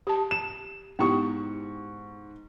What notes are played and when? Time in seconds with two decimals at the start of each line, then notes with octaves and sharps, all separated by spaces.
0.07 G4 A5
0.31 E7
0.99 G#2 B3 E4 G4 C#6